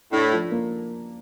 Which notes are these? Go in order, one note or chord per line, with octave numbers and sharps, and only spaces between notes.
A2 D4
F3
A#3